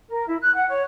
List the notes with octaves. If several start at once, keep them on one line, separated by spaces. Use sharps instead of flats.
A#4
E4
F#6
F#5
C#5